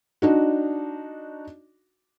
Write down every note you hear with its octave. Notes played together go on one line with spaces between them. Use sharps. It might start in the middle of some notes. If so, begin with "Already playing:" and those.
D4 D#4 F#4